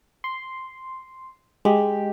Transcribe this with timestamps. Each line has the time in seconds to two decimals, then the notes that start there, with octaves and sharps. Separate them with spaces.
0.24 C6
1.65 G#3 G4